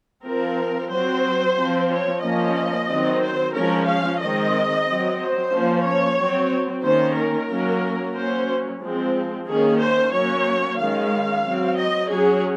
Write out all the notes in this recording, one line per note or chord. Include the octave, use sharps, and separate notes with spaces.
F3 C4 A#4
F#3 C4 C5
F3 C4
C#5
F3 A#3 C#4 D#5
D#3 F#3 C4
C5
F3 G#3 C#4 A#4
F5
D#3 G#3 C4 D#5
C4
F#3
C5
F3 A#3 C#4
C#5
F#3 C4
D#3 A#3 C#4 C5
A#4
F#3 A#3 C#4
F#3 A#3 C#4 C5
F3 G#3 C4
D#3 A#3 C#4 G#4
C5
F#3 A#3 C#4 C#5
D#3 G#3 C#4 F5
F#3 C4
D#5
F#3 C#4 G#4